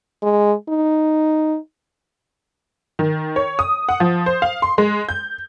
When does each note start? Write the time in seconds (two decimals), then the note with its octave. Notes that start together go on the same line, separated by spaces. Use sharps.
0.22 G#3
0.68 D#4
2.99 D#3
3.36 C#5
3.59 D#6
3.89 F#5
4.00 F3
4.26 C5
4.42 F5
4.62 C6
4.78 G#3
5.09 G6